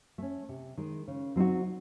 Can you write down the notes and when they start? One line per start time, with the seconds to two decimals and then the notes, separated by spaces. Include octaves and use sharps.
0.18 A3 C#4
0.49 C3
0.77 D#3 G#3
1.08 C#3
1.36 F#3 C4 D#4 F#4